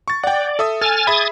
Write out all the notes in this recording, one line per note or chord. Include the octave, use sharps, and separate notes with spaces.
C#6 A6
D5 F#5 G5
A4 E5 D#6
A4 G#5 F6 A6
G#4 E5 B5 D#6 G#6 A6